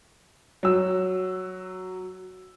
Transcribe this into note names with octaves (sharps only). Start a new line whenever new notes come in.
F#3 E6